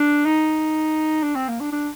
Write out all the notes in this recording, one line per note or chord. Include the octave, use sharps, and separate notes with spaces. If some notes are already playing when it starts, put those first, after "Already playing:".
Already playing: D4
D#4
D4
C4
A#3
D4
D4